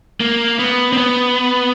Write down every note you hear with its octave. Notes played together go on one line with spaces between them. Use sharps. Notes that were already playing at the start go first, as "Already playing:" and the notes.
A#3
B3
C4
B3